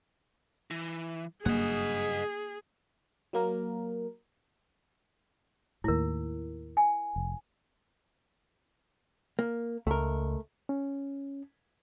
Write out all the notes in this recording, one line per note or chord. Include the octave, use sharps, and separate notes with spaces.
E3
F#1 G2 F#3 A#3 G#4 D#5 F#5
F#3 A#3 A#4
D#2 A2 E4 A#4
G#5
F1
A#3
C#2 A3 A#4
C#4